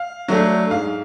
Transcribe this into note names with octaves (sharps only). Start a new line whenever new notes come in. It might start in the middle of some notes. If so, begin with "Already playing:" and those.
Already playing: F5
F#3 A3 D4
G#2 F5